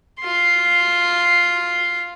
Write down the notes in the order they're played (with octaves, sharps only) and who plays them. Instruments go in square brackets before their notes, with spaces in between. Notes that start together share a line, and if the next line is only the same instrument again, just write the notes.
[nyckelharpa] F4 C6